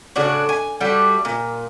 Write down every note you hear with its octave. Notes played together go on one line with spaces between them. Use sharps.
A2 C#3 D4 F#4
G#5
G3 A3 F#4
A#2